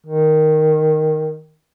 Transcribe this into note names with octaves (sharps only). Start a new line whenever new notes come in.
D#3